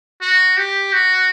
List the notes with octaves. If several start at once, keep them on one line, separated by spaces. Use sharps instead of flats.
F#4
G4
F#4